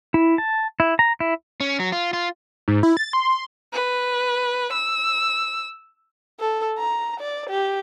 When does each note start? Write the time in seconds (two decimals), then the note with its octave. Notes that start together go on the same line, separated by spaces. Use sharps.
0.14 E4
0.38 A5
0.80 E4
0.99 A#5
1.20 E4
1.60 C#4
1.80 F#3
1.92 F4
2.13 F4
2.68 G#2
2.83 E4
2.97 A6
3.13 C6
3.73 B4
4.73 E6
6.39 A4
6.79 A#5
7.20 D5
7.50 G4